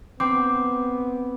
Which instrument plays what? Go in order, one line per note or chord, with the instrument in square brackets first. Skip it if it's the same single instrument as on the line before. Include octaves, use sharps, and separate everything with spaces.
[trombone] B3 [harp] C4 [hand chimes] D6